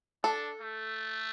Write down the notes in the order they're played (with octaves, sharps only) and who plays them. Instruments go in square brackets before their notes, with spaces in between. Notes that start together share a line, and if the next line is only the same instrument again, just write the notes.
[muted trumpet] D4 [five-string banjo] A4
[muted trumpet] A3